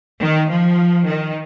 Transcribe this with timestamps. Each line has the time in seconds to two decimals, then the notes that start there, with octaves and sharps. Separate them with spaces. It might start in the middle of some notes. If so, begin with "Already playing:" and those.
0.20 D#3
0.48 F3
1.06 D#3